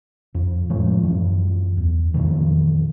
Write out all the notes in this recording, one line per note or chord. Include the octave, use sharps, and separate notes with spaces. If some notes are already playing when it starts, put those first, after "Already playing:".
F2
A2 E3 F3 G#3
F#2 E3
E2
F2 A#2 D#3 E3